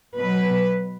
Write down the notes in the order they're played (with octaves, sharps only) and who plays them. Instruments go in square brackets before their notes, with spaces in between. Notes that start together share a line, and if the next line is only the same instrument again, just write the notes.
[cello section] B2 F#3 B4